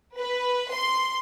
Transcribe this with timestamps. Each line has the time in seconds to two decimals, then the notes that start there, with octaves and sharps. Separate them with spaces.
0.18 B4
0.73 C6